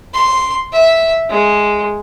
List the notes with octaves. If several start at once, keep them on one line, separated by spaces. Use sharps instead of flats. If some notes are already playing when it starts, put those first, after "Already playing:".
C6
E5
G#3